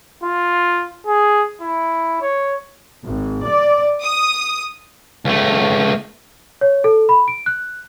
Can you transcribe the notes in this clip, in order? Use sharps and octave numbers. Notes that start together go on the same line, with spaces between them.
F4
G#4
E4
C#5
G#1
D5
D#6
C#2 A3
C#5
A4
B5
D7
F#6